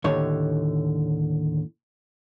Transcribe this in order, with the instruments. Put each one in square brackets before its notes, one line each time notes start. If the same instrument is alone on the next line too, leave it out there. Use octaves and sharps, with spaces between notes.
[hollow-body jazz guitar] D#2 A2 D3 C#5